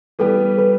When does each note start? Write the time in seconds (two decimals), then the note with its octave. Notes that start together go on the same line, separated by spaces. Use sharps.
0.19 E3 G3 B3 G4 A4
0.59 B4